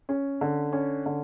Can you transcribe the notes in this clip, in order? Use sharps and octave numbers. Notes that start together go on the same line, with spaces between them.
C#4
D3
C#4
D3